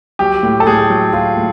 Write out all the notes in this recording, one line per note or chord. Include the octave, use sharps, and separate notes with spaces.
F#3 G4
A2
A4
A2 G#4
F#3
F#3 F4
A2